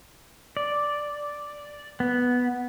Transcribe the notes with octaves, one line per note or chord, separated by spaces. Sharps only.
D5
B3